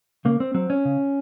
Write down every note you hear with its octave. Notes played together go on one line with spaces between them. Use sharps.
C#3 A#3
C4
F#3 C4
C#4
C#3